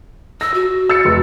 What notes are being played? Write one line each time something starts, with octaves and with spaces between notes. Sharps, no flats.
E6 A#6
F#4
E6 A6 C#7
F1